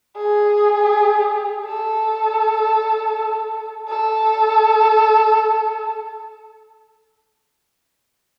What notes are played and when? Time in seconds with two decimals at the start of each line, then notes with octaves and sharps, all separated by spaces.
0.17 G#4
1.65 A4
3.89 A4